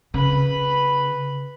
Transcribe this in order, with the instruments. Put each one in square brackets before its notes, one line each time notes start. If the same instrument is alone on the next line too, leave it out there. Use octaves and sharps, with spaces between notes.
[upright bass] C#3 [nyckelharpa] B4 B5